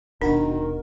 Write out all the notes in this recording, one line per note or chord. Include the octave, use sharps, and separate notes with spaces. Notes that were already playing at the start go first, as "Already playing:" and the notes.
D#1 B2 D#3 D4 F#4 A#4